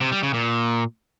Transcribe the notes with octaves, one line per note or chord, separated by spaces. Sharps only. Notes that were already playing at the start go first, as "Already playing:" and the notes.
C3
G3
C#3
A#2